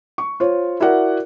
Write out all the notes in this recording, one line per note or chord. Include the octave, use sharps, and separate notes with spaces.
C#6
F4 C5 C#5
E4 F#4 A#4 D5 F#5